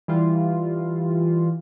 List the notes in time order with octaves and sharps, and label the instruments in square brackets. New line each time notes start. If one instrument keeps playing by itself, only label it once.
[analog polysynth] E3 G3 F4